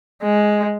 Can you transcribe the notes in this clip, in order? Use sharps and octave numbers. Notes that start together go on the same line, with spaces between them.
G#3